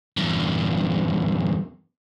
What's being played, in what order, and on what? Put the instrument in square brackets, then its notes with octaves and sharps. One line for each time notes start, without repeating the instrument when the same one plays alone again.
[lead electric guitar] E2 G2